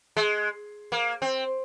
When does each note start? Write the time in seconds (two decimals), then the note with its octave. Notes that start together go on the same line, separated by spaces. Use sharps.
0.17 G#3
0.92 A#3
1.22 C4